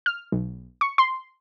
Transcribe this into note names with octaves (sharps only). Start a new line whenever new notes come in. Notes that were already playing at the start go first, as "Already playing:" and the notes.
F6
B1
C#6
C6